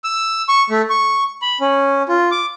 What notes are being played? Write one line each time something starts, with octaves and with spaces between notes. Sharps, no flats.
E6
C#6
A3
C#6
B5
C#4
F4
D6